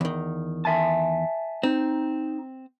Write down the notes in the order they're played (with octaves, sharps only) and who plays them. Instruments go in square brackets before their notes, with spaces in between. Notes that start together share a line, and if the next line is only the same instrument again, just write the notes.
[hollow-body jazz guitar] E2 D#3
[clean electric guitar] E5 G#5 A5
[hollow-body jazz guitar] C4 [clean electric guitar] D#4